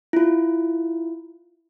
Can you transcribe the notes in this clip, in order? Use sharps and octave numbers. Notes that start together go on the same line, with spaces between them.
E4 F4